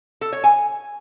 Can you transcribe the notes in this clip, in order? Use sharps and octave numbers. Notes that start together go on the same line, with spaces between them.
A4
C#5
G#5